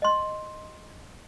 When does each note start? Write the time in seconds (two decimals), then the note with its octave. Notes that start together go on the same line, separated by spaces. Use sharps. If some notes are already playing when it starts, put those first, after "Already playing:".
0.02 D#5 C6